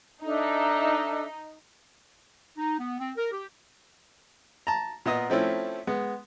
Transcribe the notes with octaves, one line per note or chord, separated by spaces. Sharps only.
D4 D#4 A4 E5
D#4
B3
C4
A#4
G4
A5 A#5
A#2 B3 D#5 D#6
F3 A3 C4 C#4 E4
G#3 B3